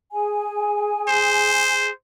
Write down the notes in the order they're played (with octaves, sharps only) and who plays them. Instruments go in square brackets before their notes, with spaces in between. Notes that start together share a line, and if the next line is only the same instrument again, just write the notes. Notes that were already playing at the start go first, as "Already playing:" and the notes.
[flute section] G#4 G#5
[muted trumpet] C5